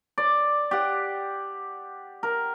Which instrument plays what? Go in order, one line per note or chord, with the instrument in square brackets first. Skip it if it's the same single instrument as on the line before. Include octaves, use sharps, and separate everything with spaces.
[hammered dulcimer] D5
G4 F#5
A#4